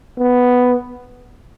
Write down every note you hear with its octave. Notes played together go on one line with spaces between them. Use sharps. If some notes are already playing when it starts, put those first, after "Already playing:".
B3